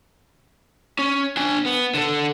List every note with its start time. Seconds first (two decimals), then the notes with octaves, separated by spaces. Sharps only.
0.99 C#4
1.37 D4 G#5
1.66 B3
1.94 D3 A4